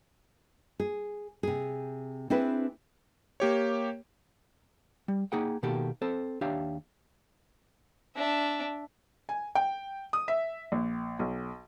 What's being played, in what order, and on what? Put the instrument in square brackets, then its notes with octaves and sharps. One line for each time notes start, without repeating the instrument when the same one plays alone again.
[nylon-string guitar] G#4
C3 G#4
C4 D4 E4 G#4 B4
[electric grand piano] A#3 G4 C#5
[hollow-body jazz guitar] G3
A#3 D#4 G#4 F#5 G5
B2 D#3 A#3 F#4 G4 A4
C4 A4 C5
D#2 D4 G4 C#5 E5 F5
[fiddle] D4 E5
[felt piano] G#5
G5
D#6
E5
A#1
B1